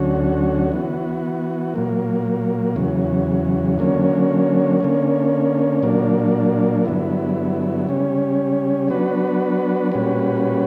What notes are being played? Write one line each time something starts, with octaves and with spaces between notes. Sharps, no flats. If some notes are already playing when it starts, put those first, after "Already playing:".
Already playing: D2 D3 F#3 C#4 F#4
E3 B3 F#4
A#2 F#3 A#3
E2 C#3 F#3
D3 F#3 A#3 C#4
D3 A#3 C#4
A#2 F#3 A#3 D4
G2 D3 F#3 B3 E4
C#3 G3 C#4
F#3 B3 D4 F#4 B4
A#2 G3 C#4 F#4 B4